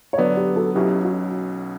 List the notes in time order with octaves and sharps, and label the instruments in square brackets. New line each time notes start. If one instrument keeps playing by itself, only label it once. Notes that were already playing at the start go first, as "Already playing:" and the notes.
[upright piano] C#5
[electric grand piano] D3 F#3 B3 [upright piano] B4 D5
[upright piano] G4 B4
F#4 A4
[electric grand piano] B1 B2 F#3 C#4 [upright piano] E4 G4
[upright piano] F#4